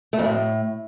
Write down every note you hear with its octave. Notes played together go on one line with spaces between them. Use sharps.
A3
F2
A2